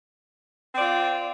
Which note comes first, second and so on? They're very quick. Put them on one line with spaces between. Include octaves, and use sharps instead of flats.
C4 D5 F4